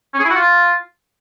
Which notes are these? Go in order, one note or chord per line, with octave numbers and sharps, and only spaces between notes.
C#4
G#4
E4
F#4
F4